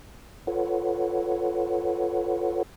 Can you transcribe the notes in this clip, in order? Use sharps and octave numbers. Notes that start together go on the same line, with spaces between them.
F4 A4 B4 C#5 F#5